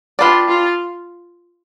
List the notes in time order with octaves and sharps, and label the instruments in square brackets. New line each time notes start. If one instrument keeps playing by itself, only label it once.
[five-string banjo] D4 G4 B4 D5 [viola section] F4
[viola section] F4